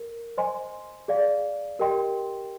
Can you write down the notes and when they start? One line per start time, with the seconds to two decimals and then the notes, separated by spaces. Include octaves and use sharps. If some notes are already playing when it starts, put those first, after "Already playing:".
Already playing: A#4
0.38 C5 D#5 G#5 C6
1.08 G#4 D5 F5
1.79 G4 A#4 D#5 G5 C6